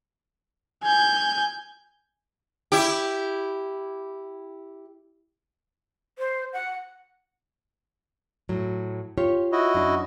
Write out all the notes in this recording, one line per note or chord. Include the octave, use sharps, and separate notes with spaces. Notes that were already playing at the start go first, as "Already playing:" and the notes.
G#5 G6
E4 G4
C5
F#5
A2 F#3
F4 G4 C#5
E4 F#4 D#5
F#2 D4